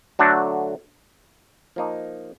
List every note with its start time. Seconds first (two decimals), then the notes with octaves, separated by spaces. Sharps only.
0.19 D3 F#3 A3 D4 F#4
1.76 F3 A#3 D#4